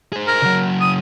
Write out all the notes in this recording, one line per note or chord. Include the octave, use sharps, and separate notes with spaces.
G#4 C5
A#4
C#3 F#3
D#6